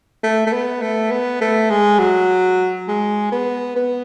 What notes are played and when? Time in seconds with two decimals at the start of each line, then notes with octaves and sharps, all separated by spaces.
0.24 A3
0.47 A3
0.53 B3
0.81 A3
1.11 B3
1.41 A3
1.70 G#3
1.99 F#3
2.88 G#3
3.32 B3
3.76 B3